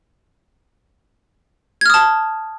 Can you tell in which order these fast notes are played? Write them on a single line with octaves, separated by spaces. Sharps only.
G#6 F6 D#6 A5